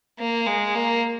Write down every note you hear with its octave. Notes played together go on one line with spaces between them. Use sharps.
A#3
G#3
A#3